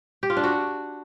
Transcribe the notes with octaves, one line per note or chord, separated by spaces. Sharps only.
G4
F4
D4
F#4